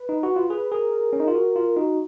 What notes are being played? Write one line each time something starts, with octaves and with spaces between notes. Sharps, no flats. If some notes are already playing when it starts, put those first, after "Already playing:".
Already playing: B4
D#4
F#4
F4
G#4 B4
G#4 A#4
C#4
D#4
F4
F#4
F4
D#4 F#4